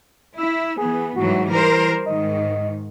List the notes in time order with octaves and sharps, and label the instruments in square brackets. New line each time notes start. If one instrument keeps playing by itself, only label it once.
[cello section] E4 [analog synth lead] E6
[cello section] E3 B3 [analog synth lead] G#4
[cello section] G#2 E3 F#3 [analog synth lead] F#4
[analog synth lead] E3 [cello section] G3 A#4 C5
[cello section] G#2 D#3 [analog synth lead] D#5